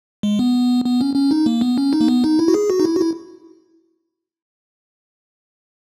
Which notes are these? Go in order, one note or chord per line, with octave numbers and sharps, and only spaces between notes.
G#3
B3
B3
C#4
C#4
D#4
A#3
B3
C#4
D#4
A#3
B3
D#4
E4
F#4
G#4
F#4
D#4
E4
F#4
E4